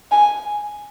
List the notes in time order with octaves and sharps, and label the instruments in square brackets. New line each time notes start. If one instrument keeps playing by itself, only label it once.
[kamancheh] G#5